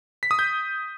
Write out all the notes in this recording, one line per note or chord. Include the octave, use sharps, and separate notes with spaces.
B6
D#6
G6